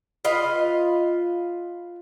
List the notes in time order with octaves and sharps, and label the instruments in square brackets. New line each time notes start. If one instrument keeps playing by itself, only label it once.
[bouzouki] F4 B4 D#5 F5